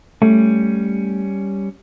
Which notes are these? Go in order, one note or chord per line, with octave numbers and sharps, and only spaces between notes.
G3 A3 C#4